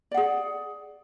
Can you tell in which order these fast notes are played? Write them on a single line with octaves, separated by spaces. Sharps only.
D5 F#5 G#4